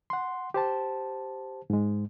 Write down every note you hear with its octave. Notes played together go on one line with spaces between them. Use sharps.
F#5 C6
G4 C5 A5
G#2 G#3